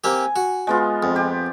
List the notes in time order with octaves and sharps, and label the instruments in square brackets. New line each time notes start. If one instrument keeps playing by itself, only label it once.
[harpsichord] A#3 C4 G4 [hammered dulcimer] G#5
[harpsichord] F#4
[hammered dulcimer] G#3 B3 F4
[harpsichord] F2
[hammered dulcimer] G4